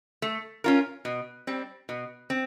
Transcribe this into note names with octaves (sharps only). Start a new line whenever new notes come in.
A3
C#4 F4 A#4
B2
G3 C4
B2
C4